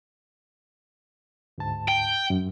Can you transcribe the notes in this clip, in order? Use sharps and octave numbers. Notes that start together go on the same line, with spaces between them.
D2 G#2 A5
G5
F#2